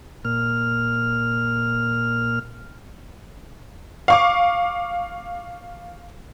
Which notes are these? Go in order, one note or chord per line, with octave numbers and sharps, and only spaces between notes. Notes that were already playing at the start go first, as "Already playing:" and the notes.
A#2 F6
F5 C#6 D6